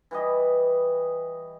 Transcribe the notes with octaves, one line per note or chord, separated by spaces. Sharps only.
E3 G3 D#5